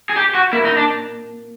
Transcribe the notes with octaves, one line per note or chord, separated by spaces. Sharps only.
G#4
G4
F#4
A#3 E4
D#4
D4